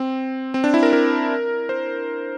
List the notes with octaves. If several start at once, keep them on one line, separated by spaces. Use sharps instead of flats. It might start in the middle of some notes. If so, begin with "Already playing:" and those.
Already playing: C4
C4
D4
E4
A#4
A#4
C5